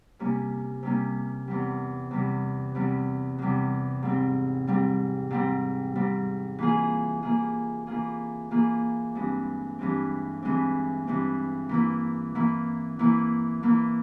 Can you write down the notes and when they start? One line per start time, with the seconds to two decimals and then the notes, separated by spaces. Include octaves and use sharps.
0.19 C3 G3 A#3 C#4
0.83 C3 G3 A#3 C#4
1.48 E2 C3 G3
2.11 E2 C3 G3
2.75 E2 C3 G3
3.38 E2 C3 G3
4.03 G#2 G3 C4
4.67 G#2 G3 C4
5.30 G#2 G3 C4
5.95 G#2 G3 C4
6.59 E3 A#3 F4 G#4
7.23 E3 A#3 F4 G#4
7.87 E3 A#3 F4 G#4
8.51 E3 A#3 F4 G#4
9.15 G2 E3 G#3 C4
9.79 G2 E3 G#3 C4
10.43 G2 E3 G#3 C4
11.07 G2 E3 G#3 C4
11.69 E3 A#3 E4
12.35 E3 A#3 E4
12.99 E3 A#3 E4
13.63 E3 A#3 E4